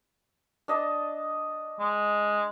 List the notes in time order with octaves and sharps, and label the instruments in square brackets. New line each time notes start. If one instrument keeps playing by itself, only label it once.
[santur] D4 D#5 A5
[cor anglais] G#3